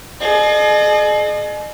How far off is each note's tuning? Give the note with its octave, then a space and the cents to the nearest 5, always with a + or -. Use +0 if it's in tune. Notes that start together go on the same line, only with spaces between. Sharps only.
G#4 +35 D#5 -40